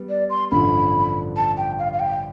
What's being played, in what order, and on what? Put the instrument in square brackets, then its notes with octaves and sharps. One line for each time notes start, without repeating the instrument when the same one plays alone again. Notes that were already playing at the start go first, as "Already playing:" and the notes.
Already playing: [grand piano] G3 B3
[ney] D5
C6
[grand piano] A1 G2 D3 F3 [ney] B5
[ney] A5
G5
F5
F5
G5